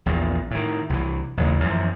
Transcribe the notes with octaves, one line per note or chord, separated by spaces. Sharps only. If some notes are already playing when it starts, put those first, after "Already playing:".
A#1 E2 A#2
A2 D#3
C2 E3
A1 D#2 C#3 E3
F#2 E3 F3